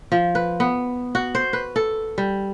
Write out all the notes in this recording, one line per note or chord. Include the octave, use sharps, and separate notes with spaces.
F3
B4
B3
F#4
C5
B4
A4
G3